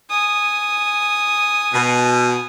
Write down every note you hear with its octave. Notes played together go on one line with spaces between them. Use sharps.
G#5 D#6
B2